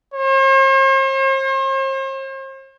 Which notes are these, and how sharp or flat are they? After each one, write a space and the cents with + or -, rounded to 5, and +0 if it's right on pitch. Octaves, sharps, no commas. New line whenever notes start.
C5 +45